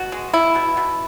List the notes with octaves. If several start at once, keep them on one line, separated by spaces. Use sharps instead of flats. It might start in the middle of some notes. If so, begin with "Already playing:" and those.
Already playing: B2 F#4
G#3
B3 E4
B2
B2